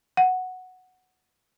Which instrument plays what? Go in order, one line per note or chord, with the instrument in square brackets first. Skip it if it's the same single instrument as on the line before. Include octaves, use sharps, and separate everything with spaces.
[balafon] F#5